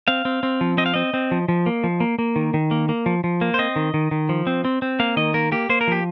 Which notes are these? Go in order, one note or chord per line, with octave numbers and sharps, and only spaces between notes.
C4 F5
C4
C4
F3
C4 D#5
F5
C4 D#5
C4
F3
F3
A#3
F3
A#3
A#3
D#3
D#3
A#3
A#3
F3
F3
A#3
C5
C4 D#5
D#3
D#3
D#3
F3
C4
C4
C4
A#3 F5
D#3 D#5
A#3 A#4
A#3 G4
A#3 C5
A#4
F3 G4